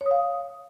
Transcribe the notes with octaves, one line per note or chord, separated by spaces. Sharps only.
C#5
D#6
F5